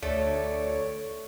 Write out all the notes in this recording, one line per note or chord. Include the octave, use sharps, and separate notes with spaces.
D2 A3 C#5 D5